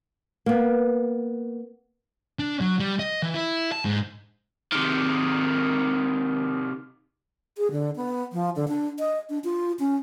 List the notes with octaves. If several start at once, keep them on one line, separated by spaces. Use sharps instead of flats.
A#3 B3
D4
F#3
G3
D#5
E3
E4
A5
G#2
C3 D#3
G#4
D3
B3
F3
D3
D4
D#5
D4
F4
C#4